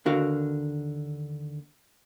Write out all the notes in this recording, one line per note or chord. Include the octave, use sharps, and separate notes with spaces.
D#2 D3 F#4 A#4 F5